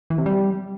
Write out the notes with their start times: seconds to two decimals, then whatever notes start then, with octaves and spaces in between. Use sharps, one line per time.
0.10 E3
0.18 C3
0.26 G3